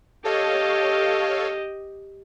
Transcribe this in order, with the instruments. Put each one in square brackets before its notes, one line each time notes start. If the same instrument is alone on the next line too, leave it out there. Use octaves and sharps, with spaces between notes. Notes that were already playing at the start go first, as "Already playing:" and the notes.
[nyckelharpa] G4 D#5 [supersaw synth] A4 C#5 F5